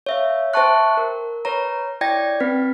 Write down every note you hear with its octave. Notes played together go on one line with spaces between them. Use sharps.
C#5 E5 F5
C5 E5 G5 A5 C#6 F#6
A#4
B4 C#5 A#5
E4 C#5 D5 G5 G#6 A#6
C4 B4 B6